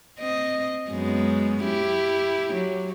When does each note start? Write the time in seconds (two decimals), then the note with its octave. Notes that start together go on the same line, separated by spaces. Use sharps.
0.19 C4 D#5
0.90 F#2 G#3 B3
1.64 E4 G4
2.54 F#3